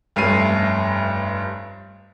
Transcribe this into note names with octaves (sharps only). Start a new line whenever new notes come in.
F1 G2 A3 C#4 C7 D#7